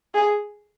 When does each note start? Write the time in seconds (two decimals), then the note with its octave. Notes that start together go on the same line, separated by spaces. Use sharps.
0.14 G#4